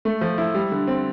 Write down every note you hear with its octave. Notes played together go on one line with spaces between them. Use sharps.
A3
F3
E4
G3
D3
C4